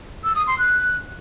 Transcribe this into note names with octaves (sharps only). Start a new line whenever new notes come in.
E6
D#6
C6
F#6